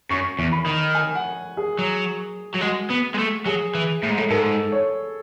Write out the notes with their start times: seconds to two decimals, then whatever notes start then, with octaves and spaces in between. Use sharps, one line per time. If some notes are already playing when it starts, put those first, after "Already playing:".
0.10 F#2 C#6
0.39 E2
0.52 B5
0.66 D#3
0.95 G#5
1.15 F#5
1.57 G#4
1.79 F#3
2.55 F#3
2.62 G#3 F#4
2.91 B3
3.15 G#3
3.19 A3
3.46 F#3 G#4
3.75 E3
4.03 A2
4.10 G#2
4.18 A2
4.30 G#2 A4
4.72 C#5